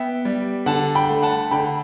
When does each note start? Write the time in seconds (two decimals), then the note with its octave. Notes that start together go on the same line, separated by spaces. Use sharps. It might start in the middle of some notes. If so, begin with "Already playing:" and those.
Already playing: B3 E5 G5
0.25 G3
0.66 D3 F#5 A5
0.95 G5 B5
1.09 A3
1.23 F#5 A5
1.51 D3 G5 B5